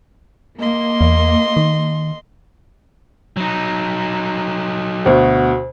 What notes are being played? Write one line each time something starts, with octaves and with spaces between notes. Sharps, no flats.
A#3 D#5 C6
E2
D#3
F#3 D#4
D2 B2 F#4 C5